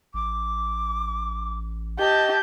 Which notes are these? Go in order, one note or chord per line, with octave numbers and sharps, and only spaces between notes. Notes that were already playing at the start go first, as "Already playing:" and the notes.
A1 D6
G4 D#5 A5 G6